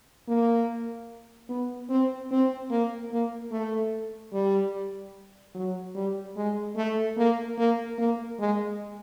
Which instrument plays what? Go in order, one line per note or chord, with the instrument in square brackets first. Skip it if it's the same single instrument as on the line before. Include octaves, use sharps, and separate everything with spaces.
[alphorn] A#3
B3
C4
C4
A#3
A#3
A3
G3
F#3
G3
G#3
A3
A#3
A#3
A#3
G#3